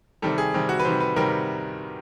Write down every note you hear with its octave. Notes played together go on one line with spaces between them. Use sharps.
C3 D#3 G3 A4
G#4
C3 D#3 G3
F#4
B4
C3 D#3 G3 C5
B4
C3 D#3 G3 A#4